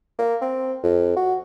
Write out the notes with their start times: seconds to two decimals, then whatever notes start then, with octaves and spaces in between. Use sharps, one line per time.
0.18 A#3
0.41 C4
0.84 F2
1.16 F#4